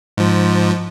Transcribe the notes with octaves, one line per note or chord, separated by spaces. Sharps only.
G#2 F3